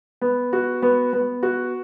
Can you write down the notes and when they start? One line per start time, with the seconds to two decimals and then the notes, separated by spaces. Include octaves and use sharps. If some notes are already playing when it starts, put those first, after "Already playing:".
0.21 B3
0.53 F#4
0.82 B3
1.13 B3
1.43 F#4